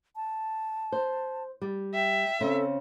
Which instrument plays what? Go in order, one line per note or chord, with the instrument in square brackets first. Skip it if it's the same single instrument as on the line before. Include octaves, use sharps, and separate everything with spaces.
[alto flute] A5
[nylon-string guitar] C5
G3
[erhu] E5 [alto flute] G5
[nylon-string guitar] C#3 C4 C#4 [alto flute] A4